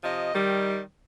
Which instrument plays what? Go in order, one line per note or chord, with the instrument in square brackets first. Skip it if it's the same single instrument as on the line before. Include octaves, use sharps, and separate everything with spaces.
[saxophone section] C3 F3 D#5
D#3 G3